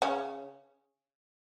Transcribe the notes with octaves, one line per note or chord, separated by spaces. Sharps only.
C#3 C#4